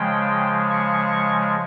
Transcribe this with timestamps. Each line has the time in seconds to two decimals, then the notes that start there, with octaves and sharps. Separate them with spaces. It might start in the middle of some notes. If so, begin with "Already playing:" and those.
Already playing: C#3 F3 G#3 G5
0.71 C#6